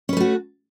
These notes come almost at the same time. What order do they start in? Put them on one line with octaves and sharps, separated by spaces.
C#4 B4 A3 F#4